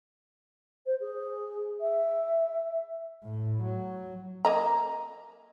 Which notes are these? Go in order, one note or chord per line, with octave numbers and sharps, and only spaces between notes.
C5
G#4
E5
A2
F#3
A#3 D#5 A#5